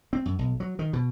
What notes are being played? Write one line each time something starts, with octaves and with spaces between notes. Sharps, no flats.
C4
F#2
B1
F#3
D#3
B2